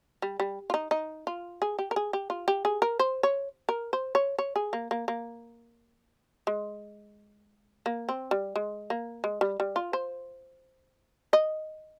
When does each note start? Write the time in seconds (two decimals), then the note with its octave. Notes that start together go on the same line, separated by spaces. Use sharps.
0.22 G3
0.40 G3
0.70 F4
0.74 D#4
0.91 D#4
1.27 F4
1.62 G#4
1.79 G4
1.91 A#4
1.96 G#4
2.13 G4
2.30 F4
2.48 G4
2.65 G#4
2.82 A#4
2.99 C5
3.23 C#5
3.69 A#4
3.93 C5
4.15 C#5
4.39 C#5
4.56 G#4
4.73 A#3
4.91 A#3
5.08 A#3
6.47 G#3
7.86 A#3
8.09 C4
8.31 G3
8.56 G#3
8.90 A#3
9.24 G#3
9.41 G3
9.60 G3
9.76 F4
9.93 C5
11.33 D#5